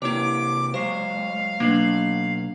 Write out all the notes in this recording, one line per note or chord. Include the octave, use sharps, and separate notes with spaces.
C3 A#3 E4 G4 C#5 D6
F#3 G#3 C5 F5 C#6
B2 F#3 A#3 D4 F#7